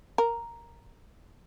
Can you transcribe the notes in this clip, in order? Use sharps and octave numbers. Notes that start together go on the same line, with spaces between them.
A#4